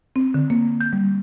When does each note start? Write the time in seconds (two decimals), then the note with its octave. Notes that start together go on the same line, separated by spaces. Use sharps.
0.16 C4
0.34 D3
0.50 A#3
0.81 G6
0.93 G3